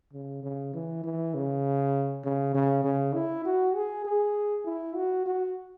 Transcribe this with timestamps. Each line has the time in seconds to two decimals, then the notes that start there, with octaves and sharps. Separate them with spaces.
0.13 C#3
0.43 C#3
0.74 E3
1.04 E3
1.34 C#3
2.24 C#3
2.54 C#3
2.84 C#3
3.14 E4
3.45 F#4
3.75 G#4
4.05 G#4
4.65 E4
4.95 F#4
5.26 F#4